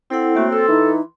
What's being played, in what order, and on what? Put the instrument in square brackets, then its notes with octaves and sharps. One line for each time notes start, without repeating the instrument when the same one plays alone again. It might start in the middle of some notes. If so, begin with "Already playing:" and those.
[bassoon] C4 [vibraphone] E4 A4 F#5
[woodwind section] A3 [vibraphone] A#3 F#4 C#5
[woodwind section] A4 [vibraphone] C6
[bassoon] E3 [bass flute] D#4